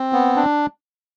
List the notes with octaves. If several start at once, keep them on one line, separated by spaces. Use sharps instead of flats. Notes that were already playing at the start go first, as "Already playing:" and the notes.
Already playing: C4
B3
D4